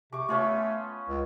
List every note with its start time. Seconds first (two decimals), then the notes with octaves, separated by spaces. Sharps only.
0.13 C3 C#6 D6
0.28 A3 B3 C#4 F4
1.08 C#2